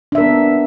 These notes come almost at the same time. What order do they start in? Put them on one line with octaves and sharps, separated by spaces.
D4 E5 A#4 B3